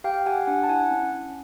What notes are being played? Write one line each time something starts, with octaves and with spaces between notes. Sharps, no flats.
G4 F5 G5
G4 F#5 G#5
D4 F#5 G#5
A5
E4 F#5 G#5
C#4
C#4